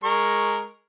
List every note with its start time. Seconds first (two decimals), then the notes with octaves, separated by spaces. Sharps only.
0.04 G#3 A#4 C#6